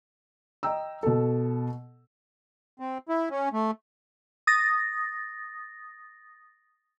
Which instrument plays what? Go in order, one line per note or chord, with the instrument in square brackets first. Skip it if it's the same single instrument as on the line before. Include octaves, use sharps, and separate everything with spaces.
[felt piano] D#5 G5 A#5 E6
B2 A4
[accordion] C4
E4
C#4
A3
[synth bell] D#6 A6 A#6